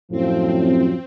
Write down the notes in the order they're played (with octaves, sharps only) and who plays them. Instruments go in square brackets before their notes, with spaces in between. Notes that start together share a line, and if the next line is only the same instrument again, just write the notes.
[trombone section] F#2 A2 F3 [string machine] C4